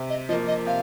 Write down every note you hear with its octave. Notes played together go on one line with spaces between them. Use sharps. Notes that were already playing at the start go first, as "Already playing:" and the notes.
Already playing: C3
D#5
F3 A#3 D#5
D#5
C3 F5